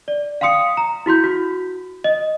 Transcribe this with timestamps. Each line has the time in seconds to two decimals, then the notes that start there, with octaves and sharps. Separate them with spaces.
0.08 D5
0.41 F5 G5 C6 D#6 C#7
0.77 A#5
1.06 E4 F#4 C6 G6
1.24 F#4
2.04 D#5